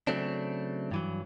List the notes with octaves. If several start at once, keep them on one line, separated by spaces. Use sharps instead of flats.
C#3 F#3 A3 C4 D4
G2 E3 F#3